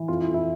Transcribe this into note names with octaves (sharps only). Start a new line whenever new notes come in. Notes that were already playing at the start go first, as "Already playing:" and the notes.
Already playing: E3
F2 F4
E4
F2
E4